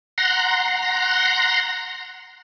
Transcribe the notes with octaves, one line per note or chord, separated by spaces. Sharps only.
F#5 A#5 C6